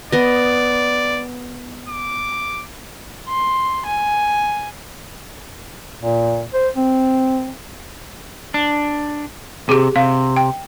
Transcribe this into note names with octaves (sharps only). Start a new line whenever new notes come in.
B3 D5 D#5
D6
C6
G#5
A#2
C5
C4
D4
C3 G4 G#4
C3 F5
G5